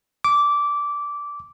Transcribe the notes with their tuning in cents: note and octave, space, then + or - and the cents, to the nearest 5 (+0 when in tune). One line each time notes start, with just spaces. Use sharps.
D6 -15